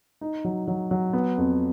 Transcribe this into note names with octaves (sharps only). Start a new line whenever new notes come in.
D#4
F#3
F#3
F#3
B3
F2